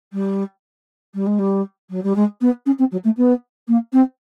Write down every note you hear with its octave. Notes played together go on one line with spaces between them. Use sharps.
G3
G3
G#3
G3
F#3
G3
G#3
B3
C#4
C4
F#3
A3
B3
A#3
C4